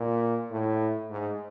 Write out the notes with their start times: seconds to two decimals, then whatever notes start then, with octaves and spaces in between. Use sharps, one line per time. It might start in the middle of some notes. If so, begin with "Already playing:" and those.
Already playing: A#2
0.51 A2
1.10 G#2